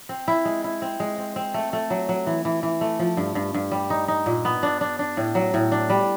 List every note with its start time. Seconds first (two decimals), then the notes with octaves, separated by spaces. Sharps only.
0.09 C4
0.28 E4
0.45 G#3
0.64 E4
0.82 C4
1.00 G#3
1.18 C4
1.36 C4
1.54 A3
1.73 A3
1.90 F#3
2.09 F#3
2.27 E3
2.45 E3
2.63 E3
2.81 A3
2.99 F3
3.17 G2
3.35 G2
3.54 G2
3.72 G3
3.90 D#4
4.08 D#4
4.26 A#2
4.45 B3
4.63 D4
4.81 D4
4.99 D4
5.17 A2
5.35 F#3
5.54 A2
5.72 D4
5.90 G3